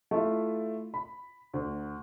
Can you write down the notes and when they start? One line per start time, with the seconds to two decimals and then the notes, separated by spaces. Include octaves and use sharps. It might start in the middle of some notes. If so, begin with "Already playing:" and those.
0.11 A3 E4 F4
0.94 B5
1.54 D2